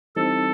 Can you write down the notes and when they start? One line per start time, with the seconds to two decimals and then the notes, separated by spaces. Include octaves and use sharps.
0.16 E3 G3 C4 D#4 A4